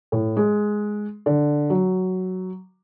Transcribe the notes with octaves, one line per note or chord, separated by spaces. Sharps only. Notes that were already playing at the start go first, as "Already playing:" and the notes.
A2
G#3
D3
F#3